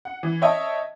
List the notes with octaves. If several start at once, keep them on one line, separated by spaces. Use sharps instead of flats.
F#5
E3
C#5 D#5 E5 G5 A5